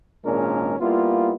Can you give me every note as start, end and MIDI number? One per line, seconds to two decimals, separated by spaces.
0.24 0.75 32
0.24 0.75 46
0.24 0.75 56
0.24 0.75 61
0.24 0.75 62
0.24 0.75 70
0.80 1.33 55
0.80 1.33 58
0.80 1.33 59
0.80 1.33 64
0.80 1.33 65